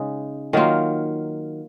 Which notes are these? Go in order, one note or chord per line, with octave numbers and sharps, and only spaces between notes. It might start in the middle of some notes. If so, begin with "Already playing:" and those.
Already playing: C#3 G#3 D#4
D#3 F#3 A#3 F4